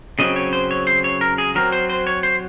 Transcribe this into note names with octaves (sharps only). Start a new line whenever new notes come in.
C#3 F#3 C4 D#5
C#5
C5
C#5
C5
C#5
A#4
G#4
F#3 C4 A#4
C5
C5
C#5
C5